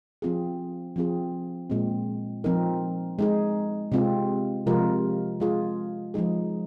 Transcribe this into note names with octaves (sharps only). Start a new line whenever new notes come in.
F3 C4 F4 G#4
F3 C4 F4 G#4
A#2 G#3 C4
F3 C4 D#4 A#4
G#3 D#4 G#4
C3 G#3 C4 F4
C3 F3 G#3 F4 A#4
G#3 F4 G#4
F3 G#3 D#4 G#4